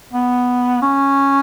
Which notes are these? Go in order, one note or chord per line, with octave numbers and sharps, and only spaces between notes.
B3
C#4